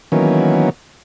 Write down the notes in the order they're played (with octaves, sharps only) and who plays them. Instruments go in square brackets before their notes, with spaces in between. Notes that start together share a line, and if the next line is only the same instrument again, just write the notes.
[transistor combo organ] D#3 E3 F#3 A#3 B3 C#4